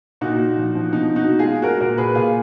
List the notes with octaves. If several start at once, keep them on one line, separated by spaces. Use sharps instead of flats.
A#2 D#4 F#4
A#2
F3
F3
B2 D#4
B2
D#4 F#4
B2
F4 G#4
G#3
G#3 F#4 A#4
A#2 F#4 A#4
A#2 G#4 B4
A#2 F4 G#4